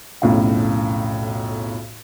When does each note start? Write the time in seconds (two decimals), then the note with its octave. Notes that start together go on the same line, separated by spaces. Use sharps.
0.22 B1 F2 A2 C#3 F5